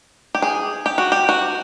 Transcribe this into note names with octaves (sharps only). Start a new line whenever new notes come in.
G4
G#4
G4
F#4
G4
F#4